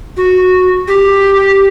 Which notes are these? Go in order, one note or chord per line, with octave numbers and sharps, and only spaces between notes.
F#4
G4